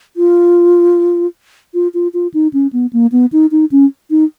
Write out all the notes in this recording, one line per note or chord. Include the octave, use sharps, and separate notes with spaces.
F4
F4
F4
F4
D#4
C#4
B3
A#3
B3
D#4
D#4
C#4
D#4